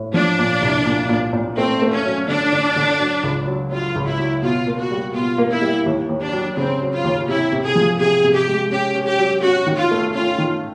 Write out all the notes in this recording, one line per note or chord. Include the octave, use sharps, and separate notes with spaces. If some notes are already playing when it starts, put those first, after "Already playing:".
Already playing: A2
F3 D4
A#2
C2
A#2
A#2
A#2
A3 C4
A3
C#4
F#3
D3 D4
D3
D3
F#3
C#2
F#3
F#3 F4
C#2
E4
F#3
B2 F4
A#3
F#4
G3
B2 F4
A#3
E4
G3
D#2
D#2
D4
F#3
C#3 C4
F#3
F4
D#2
C3 E4
C3
G#4
F3
C3 G#4
C3
G4
G#3
C#4 G4
C#4
G4
F#3
C#4 F#4
D#3
F4
A3
C#4 F4
D#3